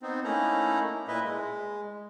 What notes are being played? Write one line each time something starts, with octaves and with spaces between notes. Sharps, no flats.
B3 C4 D#4
A3 A#3 C#4 D#4 E4 A#5
A#2 E4 B4 D#5 E5
G#3